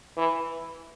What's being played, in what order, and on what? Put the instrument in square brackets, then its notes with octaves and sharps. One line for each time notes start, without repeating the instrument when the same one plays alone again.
[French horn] E3